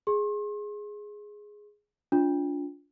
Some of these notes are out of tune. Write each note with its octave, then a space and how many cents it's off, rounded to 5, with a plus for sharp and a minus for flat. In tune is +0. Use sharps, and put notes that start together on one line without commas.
G#4 +0 C6 +40
D4 -30 F4 +10